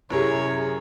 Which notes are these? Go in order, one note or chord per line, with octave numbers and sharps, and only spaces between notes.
F#2 C3 E4 G4 G#4 A#4 C#5